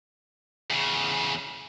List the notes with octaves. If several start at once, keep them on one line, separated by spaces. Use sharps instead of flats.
E2 C#3